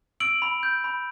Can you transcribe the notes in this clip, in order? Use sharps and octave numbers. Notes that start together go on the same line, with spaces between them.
E6 D7 F#7
B5
G6
B5